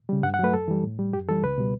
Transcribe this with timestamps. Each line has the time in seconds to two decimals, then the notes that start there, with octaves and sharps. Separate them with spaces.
0.09 C#3 G3
0.23 G2 F#5
0.34 F#5
0.39 F#3 A3 B4
0.53 F#2 A4
0.68 E3 G3
0.84 A2
0.99 G3
1.13 F#2 G4
1.28 E3 G3 A4
1.43 C#2 B4
1.58 B2 G3